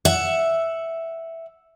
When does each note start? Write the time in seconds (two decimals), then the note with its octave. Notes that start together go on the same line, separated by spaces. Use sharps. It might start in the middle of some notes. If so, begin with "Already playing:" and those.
0.05 E5 F#5